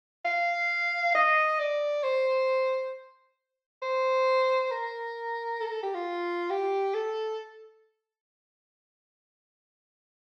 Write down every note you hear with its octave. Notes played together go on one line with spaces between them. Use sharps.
F5
D#5
D5
C5
C5
A#4
A4
A#4
A4
G4
F4
G4
A4